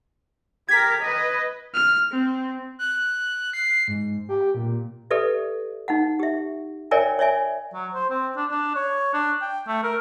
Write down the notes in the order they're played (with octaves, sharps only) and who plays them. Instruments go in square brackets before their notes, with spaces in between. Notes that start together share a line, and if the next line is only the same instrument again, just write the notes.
[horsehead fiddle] G4 A#4 [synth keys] G#6 B6
[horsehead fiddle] B4 D#5
[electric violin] F6
C4
[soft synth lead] F#6
C7
G#2
G4
A#2
[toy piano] G4 A4 B4 D5 E5
D#4 F5 F#5
G4 E5
A#4 C#5 D5 E5 G5 G#5
C#5 D5 E5 G#5
[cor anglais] F#3
C5
C4
D4
D4
C#5
D4
G5
A3
A#4